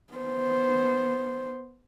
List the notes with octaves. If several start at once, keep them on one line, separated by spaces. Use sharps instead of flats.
B3 C5